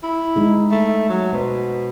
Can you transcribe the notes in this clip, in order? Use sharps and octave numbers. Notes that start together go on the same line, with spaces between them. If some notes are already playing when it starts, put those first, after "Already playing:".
E4
G#3 D#4 G#4
A3
F#3
B2 C5